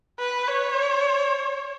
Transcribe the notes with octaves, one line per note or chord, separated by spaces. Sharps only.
B4
C#5